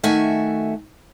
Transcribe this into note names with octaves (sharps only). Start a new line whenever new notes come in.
D#3 A3 F#4 E5 G#5